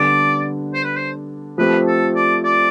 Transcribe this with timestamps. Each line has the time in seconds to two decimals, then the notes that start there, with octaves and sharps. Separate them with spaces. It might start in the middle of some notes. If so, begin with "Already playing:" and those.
Already playing: D3 G3 B3 D4 D5
0.74 C5
0.84 B4
0.96 C5
1.58 F3 A3 C4 G4 B4
1.87 A4
2.16 D5
2.44 D5